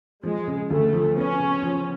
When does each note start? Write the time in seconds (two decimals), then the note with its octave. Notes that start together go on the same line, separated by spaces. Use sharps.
0.23 F3 G#3
0.47 C#3
0.70 D2 A3
0.93 F3
1.16 B3 C#4
1.39 C#3
1.62 F3